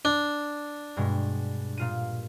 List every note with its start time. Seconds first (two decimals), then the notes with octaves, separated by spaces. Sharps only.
0.05 D4
0.97 G2 B2 G#3
1.78 A#2 F4 D#7